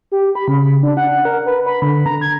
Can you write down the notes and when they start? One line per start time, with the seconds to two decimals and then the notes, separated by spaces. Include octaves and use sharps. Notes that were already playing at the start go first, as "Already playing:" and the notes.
0.12 G4
0.35 B5
0.48 C#3
0.83 D4
0.97 F#5
1.25 A#4
1.46 B4
1.66 B5
1.82 D3
2.06 A#5
2.21 G#6